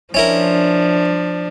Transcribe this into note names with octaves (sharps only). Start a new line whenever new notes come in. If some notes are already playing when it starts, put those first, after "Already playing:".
F3 C#4 D4 E4 A#4